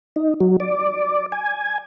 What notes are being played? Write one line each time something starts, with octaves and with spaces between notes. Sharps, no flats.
D#4
F#3
D5
G#5